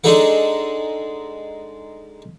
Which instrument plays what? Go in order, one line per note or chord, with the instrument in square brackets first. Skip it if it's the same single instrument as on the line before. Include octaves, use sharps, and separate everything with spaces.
[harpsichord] G#3 D4 D#4 G#4 A4 F#5